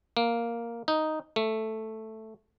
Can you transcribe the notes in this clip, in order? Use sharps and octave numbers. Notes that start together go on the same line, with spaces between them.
A#3
D#4
A3